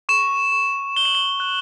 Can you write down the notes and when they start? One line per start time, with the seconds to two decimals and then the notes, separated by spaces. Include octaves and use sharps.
0.09 C#6 E7
0.52 C#6
0.96 F#6 G7
1.05 F#7
1.15 G7
1.40 F#6